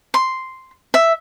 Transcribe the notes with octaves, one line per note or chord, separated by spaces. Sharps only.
C6
E5